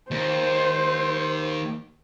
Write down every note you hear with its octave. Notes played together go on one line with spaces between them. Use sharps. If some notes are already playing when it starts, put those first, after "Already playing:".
D#2 C5